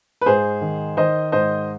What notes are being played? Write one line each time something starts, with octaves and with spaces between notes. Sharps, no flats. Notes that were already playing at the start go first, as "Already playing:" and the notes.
B4
G#2 G#4 C5
D#3
D#3 C5 D#5
G#2 C5 D#5